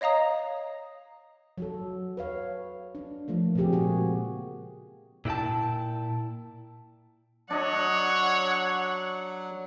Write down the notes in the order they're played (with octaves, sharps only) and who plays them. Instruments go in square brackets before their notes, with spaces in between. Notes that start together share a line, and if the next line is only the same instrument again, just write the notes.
[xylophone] C#5 D#5 F5 A#5 D#6
[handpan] F#3 F#4 A4
B4 C#5 F5
D4
F3 A3 A#3
A#2 C#3 C4 G4 G#4
G#3 A#3 F#4 G#4
[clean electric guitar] A#2 E4 F#4 G5 A5
[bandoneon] F#3 [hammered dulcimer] D4 D#5 [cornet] C#5 [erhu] F#5